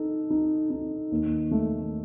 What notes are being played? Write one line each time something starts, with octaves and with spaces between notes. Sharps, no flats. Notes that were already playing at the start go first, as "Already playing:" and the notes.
Already playing: D#4 A4
D#4
D#4
D#2
A3